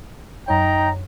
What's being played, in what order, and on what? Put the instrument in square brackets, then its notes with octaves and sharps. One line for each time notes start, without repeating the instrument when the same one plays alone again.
[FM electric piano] F#2 C#5 [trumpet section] D#4 G5 A#5